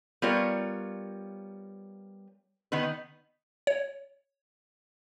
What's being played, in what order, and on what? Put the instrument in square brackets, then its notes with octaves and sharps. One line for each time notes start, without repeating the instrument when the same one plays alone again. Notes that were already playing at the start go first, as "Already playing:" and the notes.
[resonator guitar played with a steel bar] G3 B3 F4 A#4 C#5
D#3 B3 D#4 B4
[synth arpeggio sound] C#5